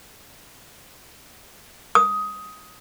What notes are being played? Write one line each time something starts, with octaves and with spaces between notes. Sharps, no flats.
D#6